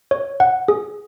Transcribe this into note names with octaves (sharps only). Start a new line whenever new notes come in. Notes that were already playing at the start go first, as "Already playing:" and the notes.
C#5
F#5
G#4